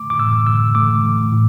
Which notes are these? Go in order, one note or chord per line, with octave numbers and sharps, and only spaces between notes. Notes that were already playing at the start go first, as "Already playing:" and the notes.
Already playing: A3 D6
D6
A2 E6
A2 E6
A3 D6
A3
A2